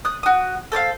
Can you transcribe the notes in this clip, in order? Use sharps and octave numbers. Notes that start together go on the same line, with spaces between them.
D#6 F#6
F#4 D#6
A4 C5 C#5 F5